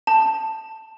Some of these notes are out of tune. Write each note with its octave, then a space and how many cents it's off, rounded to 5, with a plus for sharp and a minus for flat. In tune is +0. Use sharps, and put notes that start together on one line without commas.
A5 +5